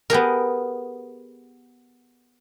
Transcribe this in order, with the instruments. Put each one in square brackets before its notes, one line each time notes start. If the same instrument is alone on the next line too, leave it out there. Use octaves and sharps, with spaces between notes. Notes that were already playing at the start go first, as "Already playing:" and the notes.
[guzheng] B3 G4 G#4 A#4